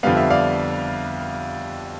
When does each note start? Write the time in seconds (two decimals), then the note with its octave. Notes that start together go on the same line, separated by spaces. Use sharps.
0.03 F2 D3 G3 B3 F5
0.17 E5
0.30 D5 F5